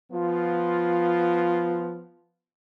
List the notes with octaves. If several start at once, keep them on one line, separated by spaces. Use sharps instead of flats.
F3 B3 F4